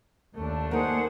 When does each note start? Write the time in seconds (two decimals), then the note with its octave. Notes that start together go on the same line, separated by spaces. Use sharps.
0.35 D#2 A3 D4
0.71 A#3 D#4 G#4 C5 F#5